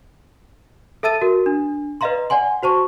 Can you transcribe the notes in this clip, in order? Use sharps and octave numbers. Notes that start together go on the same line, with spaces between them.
A4 E5 A5 E6 A6 D#7
F#4 A#4
D4
B4 D5 D#5 F5 A#5 C6
D5 F#5 G#5 C6
F#4 C5 A5 C#6